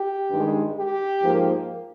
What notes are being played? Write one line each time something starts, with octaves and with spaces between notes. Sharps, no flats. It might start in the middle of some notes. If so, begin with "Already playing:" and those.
Already playing: G4
G2 D#3 G#3
G4
G#2 F3 A#3